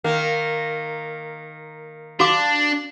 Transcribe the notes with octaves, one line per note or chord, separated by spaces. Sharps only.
D#3 A#3
D4 F#4 F5 D6